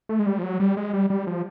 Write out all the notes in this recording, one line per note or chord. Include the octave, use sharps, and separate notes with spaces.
A3
G#3
G3
F3
F#3
G3
G#3
G3
G3
F3